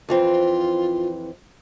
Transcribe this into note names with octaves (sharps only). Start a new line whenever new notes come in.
F2 E3 C4 F4